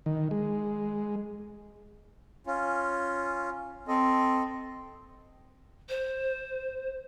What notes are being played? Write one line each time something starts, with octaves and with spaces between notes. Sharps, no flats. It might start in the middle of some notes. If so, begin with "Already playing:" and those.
D#3
G#3
C#4 F4
C4 A4 D#5
C5